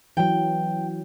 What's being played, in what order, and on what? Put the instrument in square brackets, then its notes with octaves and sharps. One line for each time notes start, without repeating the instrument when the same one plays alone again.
[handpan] E3 F#3 [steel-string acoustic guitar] G5